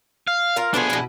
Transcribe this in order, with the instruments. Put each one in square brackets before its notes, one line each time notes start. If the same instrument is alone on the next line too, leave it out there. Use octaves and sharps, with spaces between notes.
[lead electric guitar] F5
[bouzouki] F4 A#4 F5
[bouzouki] F3 A3 B3 [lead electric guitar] D4 G#4
[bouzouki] B2 E4